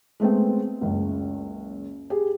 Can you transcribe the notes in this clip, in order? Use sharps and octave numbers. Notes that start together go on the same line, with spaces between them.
G#3 A3 B3 C4
F#1 C#2
G4 G#4